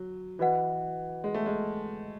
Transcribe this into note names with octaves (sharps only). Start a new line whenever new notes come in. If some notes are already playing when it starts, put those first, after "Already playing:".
Already playing: F#3
E3 F#4 B4 D#5 F#5
G#3
A3
G#3